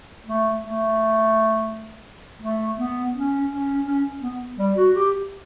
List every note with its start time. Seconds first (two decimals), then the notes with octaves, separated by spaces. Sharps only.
0.26 A3
0.62 A3
2.42 A3
2.78 B3
3.15 C#4
3.50 C#4
3.86 C#4
4.22 B3
4.58 G3
4.76 F#4
4.94 G4